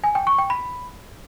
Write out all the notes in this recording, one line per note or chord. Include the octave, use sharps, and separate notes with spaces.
G#5
G5
C#6
G5
B5